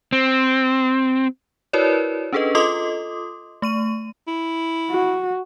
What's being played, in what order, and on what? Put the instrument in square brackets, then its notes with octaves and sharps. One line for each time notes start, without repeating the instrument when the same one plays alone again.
[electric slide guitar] C4
[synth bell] E4 F#4 A#4 B4 C#5 D5
C#4 D4 G#4 A4 B4 D#5
F4 A4 D#5 C6 D6 D#6
A3 C#6 D#7
[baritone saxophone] E4
[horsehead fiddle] F#4